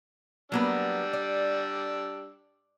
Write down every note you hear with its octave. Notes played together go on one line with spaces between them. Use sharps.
F#3 G3 A#3 B3 D4 E6
D5